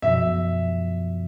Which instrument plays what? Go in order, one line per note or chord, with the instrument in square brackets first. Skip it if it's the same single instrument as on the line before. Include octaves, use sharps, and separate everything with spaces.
[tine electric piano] F#2 B2 F3 [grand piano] E5